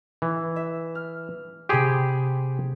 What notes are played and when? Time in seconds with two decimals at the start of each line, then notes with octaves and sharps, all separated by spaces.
0.22 E3
0.56 E5
0.95 F6
1.69 C3 G4 G#4 B5 C6